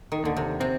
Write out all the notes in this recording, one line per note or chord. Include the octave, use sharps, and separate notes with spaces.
D#3
D#2 D3
C3
C3 C4